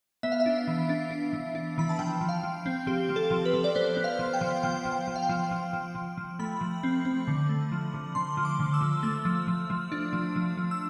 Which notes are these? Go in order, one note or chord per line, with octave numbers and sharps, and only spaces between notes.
B3 E5
F5
E5
D4
E3
D4
D4
E3
D4
E3 B5
A5
F3 G5
F3
F5
F3
C4
F3 G4
F3
A4
F3
B4
F3
D5
B3 C5
B3
F5
F3
G5
F3
F3 G5
F3
G5
F3
F5
G5
F3
F3
F3
F3
F3
A3 B5
F3
C4
C4
D3
A3
F3
D3
D3 C6
F3
D6
D3
E6
F3
A3 E6
F3
F3
F3
D4
F3
F3
F3
E6